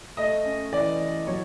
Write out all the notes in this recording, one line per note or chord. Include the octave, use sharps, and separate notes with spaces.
A3 D#5
C#4
E3 D5
E3
F#3 C#5